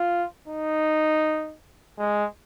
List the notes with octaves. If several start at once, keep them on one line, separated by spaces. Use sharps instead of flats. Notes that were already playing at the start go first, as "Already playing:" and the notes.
Already playing: F4
D#4
G#3